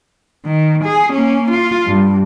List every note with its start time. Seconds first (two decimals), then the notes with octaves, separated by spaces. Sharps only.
0.45 D#3
0.84 G#4
1.13 A#3 C#4
1.51 F4
1.86 G2